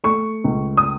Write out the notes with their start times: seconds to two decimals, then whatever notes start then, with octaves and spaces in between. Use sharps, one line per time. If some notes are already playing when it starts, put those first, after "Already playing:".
0.04 A3 C#6
0.44 C#2
0.77 D#6